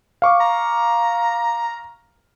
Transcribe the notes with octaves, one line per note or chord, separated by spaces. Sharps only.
F5 C#6 D6
A#5